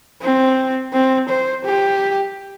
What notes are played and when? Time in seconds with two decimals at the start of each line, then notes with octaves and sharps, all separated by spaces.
0.22 C4
0.93 C4
1.29 C5
1.65 G4